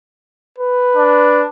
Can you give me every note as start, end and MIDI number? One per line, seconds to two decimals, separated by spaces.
0.59 1.48 71
0.96 1.46 62